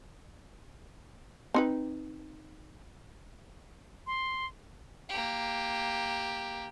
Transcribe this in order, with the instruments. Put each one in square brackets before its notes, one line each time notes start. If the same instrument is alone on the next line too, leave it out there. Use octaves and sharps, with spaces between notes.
[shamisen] C4 D#4 B4
[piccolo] C6
[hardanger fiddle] A#3 G4